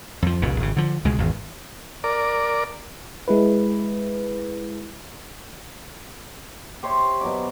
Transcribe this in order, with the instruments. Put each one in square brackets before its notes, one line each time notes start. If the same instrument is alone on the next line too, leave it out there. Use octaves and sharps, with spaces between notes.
[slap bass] F2 F3
F1 C2 A#2 C#3
G#1 C#3
D3 F3
C#2 B2 G#3
G#1 E2
[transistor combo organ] A#4 D5
[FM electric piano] G#3 E4 B4
[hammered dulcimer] G4 C5 C#5 E5
B2 F#3 D6